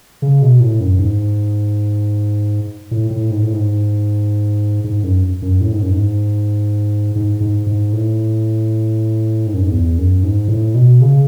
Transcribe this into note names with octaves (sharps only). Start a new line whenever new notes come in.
C#3
B2
A2
F#2
G#2
A2
A2
G#2
A2
G#2
G#2
F#2
F#2
A2
G#2
F#2
G#2
G#2
G#2
G#2
A2
G#2
F#2
G#2
E2
F#2
G#2
A2
B2
C#3